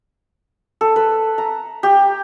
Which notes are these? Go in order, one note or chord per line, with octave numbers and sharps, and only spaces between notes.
A4
B4
A#5
G4